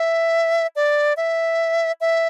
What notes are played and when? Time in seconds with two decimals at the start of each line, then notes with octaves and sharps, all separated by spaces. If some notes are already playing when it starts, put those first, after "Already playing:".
Already playing: E5
0.76 D5
1.17 E5
2.01 E5